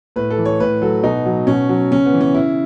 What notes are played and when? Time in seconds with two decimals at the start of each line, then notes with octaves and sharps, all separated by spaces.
0.16 A2 B4
0.30 A4
0.38 E3
0.45 C#5
0.60 A2 B4
0.82 F#3 A4
1.03 B2 D#4
1.26 F#3
1.47 B2 C#4
1.69 F#3
1.91 C#3 C#4
2.05 B3
2.13 E3
2.21 C#4
2.34 C#3 E4